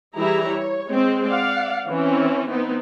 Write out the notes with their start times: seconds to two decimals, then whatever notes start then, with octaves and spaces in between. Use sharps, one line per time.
0.15 E3 G3 E4 G4 G#4 A#5
0.48 C#5
0.88 G#3 C4
1.26 D5 F5 F#5
1.87 E3 C4 C#4 E4
2.49 B3 C4 D#4